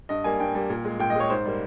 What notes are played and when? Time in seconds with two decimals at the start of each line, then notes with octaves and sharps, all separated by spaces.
0.09 G2 D#5
0.24 G3 A#3 G#5
0.40 G2 G5
0.55 G3 A#3
0.70 A#2
0.85 G#3
0.99 A#2 G5
1.10 D#5
1.15 G#3 C#5
1.30 G#2 C5
1.46 G3 A#3